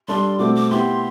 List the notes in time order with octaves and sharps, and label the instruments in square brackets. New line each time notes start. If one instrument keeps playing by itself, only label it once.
[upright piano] G3 D4 A4 [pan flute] C6
[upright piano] B2 A3 C4 [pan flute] D6
[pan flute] D6
[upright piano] B3 E4 G4 [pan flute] C6